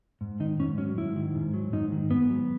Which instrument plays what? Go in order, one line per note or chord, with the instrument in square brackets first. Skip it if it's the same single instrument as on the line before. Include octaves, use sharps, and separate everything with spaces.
[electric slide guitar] G#2
D#3 D#4
G#2 C#4
F#3 C#4
G#2 E4
D#3
G#2
F#3
G#2 D#4
D#3
G#2 B3
F#3